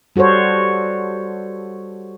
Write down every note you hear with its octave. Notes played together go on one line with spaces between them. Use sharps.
G3 F#4 A4 C5 C#5